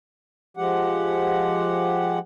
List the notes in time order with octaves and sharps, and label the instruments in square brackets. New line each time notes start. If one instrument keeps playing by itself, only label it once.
[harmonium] F3 G#3 G4 F#5